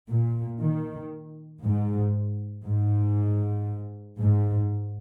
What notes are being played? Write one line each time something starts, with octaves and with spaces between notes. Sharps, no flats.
A#2
D#3
G#2
G#2
G#2